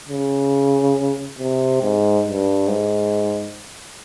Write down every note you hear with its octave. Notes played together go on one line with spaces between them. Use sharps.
C#3
C3
G#2
G2
G#2